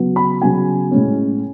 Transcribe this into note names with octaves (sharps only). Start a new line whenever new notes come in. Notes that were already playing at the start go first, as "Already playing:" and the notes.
Already playing: C#3 F#3 B3
B5
C#3 F#3 B3 G#5
A2 G#3 C#4